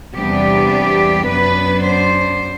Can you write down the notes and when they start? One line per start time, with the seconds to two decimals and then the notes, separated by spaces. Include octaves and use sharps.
0.15 E2 C3 G3 B3 D4 G4
1.27 F#2 F#3 B3 D4 B4
1.83 C5